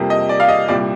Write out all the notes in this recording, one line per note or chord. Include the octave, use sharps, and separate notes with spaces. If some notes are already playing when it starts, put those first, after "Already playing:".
Already playing: F2 C3 G3 A#3
D#5
D5
F5
D#5
C2 A#2 G3 D5